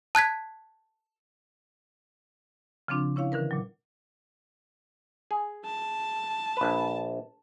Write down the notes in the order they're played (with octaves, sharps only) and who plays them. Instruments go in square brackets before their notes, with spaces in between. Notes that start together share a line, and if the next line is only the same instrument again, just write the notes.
[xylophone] A5 F#6 G#6 B6
[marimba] C#3 F3 C4 D4 F4
C#4 E4 C#5 F5
D3 E3 A#4 B4
A#2 F#3
[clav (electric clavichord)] G#4
[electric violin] A5
[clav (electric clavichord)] A#1 B4